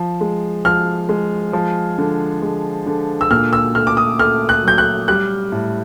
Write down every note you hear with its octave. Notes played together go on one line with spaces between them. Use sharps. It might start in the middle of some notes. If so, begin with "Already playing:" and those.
Already playing: F3
G#3
F3 F6
G#3
F3
D3
G#3
D3
E6
A#2 F6
E6
A3 F6
D6
D#6
A3 F6
F#6
F#3 G6
F#6
G3 F#6
A2